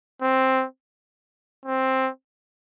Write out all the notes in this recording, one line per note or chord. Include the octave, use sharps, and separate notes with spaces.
C4
C4